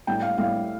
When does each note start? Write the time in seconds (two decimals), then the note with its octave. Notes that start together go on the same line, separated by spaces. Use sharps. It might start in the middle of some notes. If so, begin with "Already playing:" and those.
0.07 A2 G3 G5
0.22 F5
0.38 A2 G3 F5